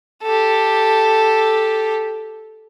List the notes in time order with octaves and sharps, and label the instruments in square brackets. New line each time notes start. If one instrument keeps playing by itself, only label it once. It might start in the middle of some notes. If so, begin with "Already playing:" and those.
[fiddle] G4 A4